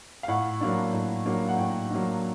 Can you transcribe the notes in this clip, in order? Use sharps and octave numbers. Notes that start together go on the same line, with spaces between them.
F5
A2 F#5
F#3 A#3 D4
A2
F#3 A#3 D4
F#5
A2 G5
F#3 A#3 D4